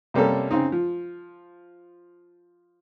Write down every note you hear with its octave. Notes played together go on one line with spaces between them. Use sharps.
C3 G3 A#3 C#4 A4
C#3 C4 D#4
F3